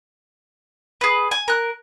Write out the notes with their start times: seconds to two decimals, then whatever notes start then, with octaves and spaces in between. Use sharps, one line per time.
1.01 G#4 B4
1.31 G#5
1.48 A#4 F#6